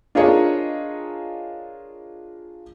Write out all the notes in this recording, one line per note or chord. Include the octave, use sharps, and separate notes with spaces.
D4 F4 G#4 A#4 C#5 D#5